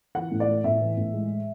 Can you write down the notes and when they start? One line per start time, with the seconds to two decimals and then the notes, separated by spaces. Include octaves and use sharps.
0.15 E3 F#5
0.32 A2
0.40 D5
0.48 A3
0.64 A2 E5
0.81 E3
0.97 A2
1.14 G#3